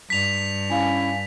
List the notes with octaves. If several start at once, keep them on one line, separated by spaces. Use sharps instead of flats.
G2 B6 F7
C#4 E4 F5 G#5